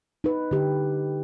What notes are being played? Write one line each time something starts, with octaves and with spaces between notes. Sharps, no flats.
D#4 B4
D3 G4